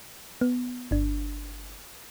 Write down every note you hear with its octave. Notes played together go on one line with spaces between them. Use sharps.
B3
G1 D4